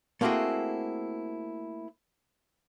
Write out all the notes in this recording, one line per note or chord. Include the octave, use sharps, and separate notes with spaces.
A3 A#3 C4 E4 F#4 G#4